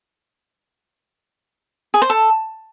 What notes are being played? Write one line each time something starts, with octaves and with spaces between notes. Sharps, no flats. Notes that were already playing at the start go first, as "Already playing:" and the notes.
G#4
C5
A4